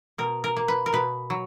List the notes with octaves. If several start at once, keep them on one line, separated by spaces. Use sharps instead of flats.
B2 A#4
A#4
A#3
B4
A#4
B2 B4
F#3